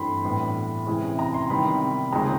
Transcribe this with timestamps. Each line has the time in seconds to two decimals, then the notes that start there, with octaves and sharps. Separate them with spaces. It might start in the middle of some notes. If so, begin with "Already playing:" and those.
Already playing: G2 E3 A3 C4 B5 C6
0.24 A2 E3 G3 B3
0.86 C3 E3 G#3 C#4
1.19 A#5
1.34 C6
1.50 C3 D#3 G3 B3 B5
2.12 D#2 C#3 F3 G#3 C4 A#5